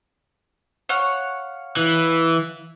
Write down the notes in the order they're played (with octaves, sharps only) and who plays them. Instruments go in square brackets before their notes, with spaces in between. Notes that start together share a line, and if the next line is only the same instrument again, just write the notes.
[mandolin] C#5 F5 F#5
[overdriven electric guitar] E3